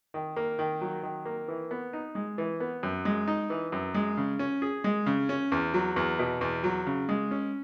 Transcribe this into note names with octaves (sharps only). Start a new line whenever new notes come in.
D#3
A#3
D#3
F#3
D#3
A#3
E3
B3
D#4
G#3
E3
B3
F#2
G#3
D#4
E3
F#2
G#3
C#3
C#4
G#4
G#3
C#3
C#4
E2
F#3
E2
B2
E2
F#3
C#3
G#3
C#4